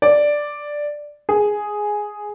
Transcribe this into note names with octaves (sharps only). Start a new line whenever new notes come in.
D5
G#4